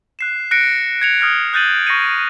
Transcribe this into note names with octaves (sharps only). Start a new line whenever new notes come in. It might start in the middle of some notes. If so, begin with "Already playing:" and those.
F#6 C7 E7
F#6 A#6 C#7 D7
G#6 C#7 F7
D#6 F6 G#6 A#6
D#6 F#6 G6 A6 D#7 F#7
C#6 A#6 C7 C#7 D#7